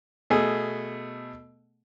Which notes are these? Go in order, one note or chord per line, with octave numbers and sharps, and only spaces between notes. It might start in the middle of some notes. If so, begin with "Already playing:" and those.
B2 A3 G#4